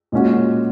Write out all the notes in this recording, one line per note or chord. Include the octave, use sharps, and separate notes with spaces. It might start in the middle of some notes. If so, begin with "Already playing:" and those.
A#2 G#3 C#4 F#4